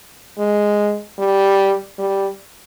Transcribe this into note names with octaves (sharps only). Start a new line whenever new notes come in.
G#3
G3
G3